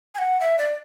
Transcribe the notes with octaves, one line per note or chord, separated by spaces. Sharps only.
G#5
F#5
E5
D5